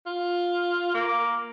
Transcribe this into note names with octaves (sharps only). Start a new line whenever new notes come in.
F4
A#3